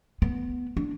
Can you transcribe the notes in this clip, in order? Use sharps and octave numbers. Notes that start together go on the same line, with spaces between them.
B3
D4